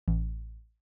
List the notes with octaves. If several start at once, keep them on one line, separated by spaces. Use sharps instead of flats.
A1